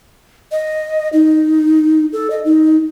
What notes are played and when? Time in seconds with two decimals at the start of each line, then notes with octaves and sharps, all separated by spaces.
0.51 D#5
1.12 D#4
2.12 A4
2.30 D#5
2.44 D#4